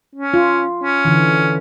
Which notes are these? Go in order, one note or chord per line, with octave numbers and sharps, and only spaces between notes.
C#4
F4
C#4
D3 E3